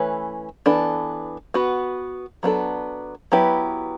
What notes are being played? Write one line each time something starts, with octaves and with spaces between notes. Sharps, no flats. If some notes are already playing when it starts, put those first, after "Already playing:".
Already playing: E3 A3 C#4 B4
E3 B3 D4 A4
B3 F#4 B4
F#3 B3 D4 A4
F#3 B3 E4 G4 B4